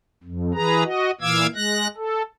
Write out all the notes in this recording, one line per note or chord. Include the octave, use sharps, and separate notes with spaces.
F2
E3 G#4 B4 A#5
F#4 D#5
A#2 E3 F5 D6 E6 G#6
G#3 F#6 A#6
A4